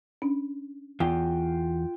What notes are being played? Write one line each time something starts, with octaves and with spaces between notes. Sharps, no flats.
C#4 D4
E2 F4 G5